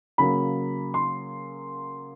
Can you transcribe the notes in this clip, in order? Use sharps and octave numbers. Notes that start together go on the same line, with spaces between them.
C#3 F#3 A#3 B5
C6